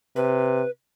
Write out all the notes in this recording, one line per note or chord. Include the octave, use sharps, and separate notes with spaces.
C3 B4